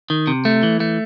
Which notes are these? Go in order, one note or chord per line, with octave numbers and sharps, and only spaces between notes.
D#3
C3
A3
E3
A3